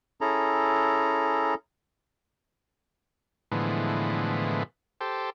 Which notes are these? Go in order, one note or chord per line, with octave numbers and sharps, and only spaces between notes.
C#4 E4 G#4 A4 A#5
A2 D3 E3 F3 G#3 B3
G4 A4 C5